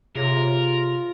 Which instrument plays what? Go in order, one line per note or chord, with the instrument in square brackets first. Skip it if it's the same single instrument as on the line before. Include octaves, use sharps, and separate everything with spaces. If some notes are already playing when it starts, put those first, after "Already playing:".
[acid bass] C3 [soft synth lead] F4 [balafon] G#4 C#5 [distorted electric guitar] A#4